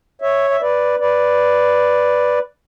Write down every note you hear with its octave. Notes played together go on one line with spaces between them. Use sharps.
C#5 E5
E5
B4 D5
B4 D5